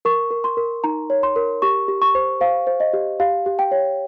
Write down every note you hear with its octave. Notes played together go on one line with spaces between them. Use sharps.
A#4 C#6
A#4
C6
A#4
D#4 A#5
C#5
C6
A#4
G4 C#6
G4
C#6
C5
C5 F5
C5
D#5
G4
G4 F5
G4
G5
C#5